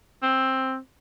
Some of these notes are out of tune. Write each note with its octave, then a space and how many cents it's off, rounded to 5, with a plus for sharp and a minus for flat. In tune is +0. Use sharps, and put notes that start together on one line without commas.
C4 +10